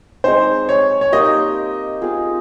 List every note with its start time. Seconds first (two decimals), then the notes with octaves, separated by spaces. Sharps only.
0.24 G#3 C4 D#4 C5
0.69 C#5
1.01 C#5
1.12 A#3 D#4 G4 C5 D#5
2.02 C4 F4 G#4